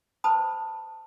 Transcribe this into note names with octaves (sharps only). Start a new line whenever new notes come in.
B4 C5 G5 A5 B5 D#6